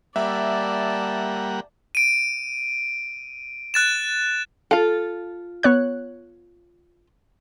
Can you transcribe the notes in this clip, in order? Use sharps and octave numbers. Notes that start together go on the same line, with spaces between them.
G3 A#3 D5 E5 F#5 A5
D7 D#7
F#6 A6 E7
F4 A4 F5
B3 C#5 F#6